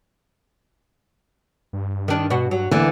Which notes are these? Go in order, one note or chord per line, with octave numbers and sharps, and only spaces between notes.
G2
D#3 D4
B2 F#4
F#3
D2 D3 E3 A#3